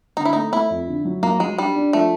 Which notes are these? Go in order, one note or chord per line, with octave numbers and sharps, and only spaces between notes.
D3 D#4
E4
A3 D#4
A3 E4
F2
D3
F#3
F#3 A#3
F#3 G#3
G3 D4
D4
F3 A3